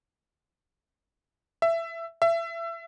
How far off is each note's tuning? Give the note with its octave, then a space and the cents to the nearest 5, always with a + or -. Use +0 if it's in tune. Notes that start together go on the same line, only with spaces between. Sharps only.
E5 +15
E5 +25